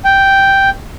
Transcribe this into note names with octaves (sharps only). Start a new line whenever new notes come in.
G5